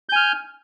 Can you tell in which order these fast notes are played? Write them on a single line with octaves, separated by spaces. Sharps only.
G6 G#5 F6